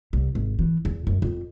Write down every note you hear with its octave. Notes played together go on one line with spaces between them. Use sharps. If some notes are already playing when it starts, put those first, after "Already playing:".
C2
G#1
E3
E2
F#2
F2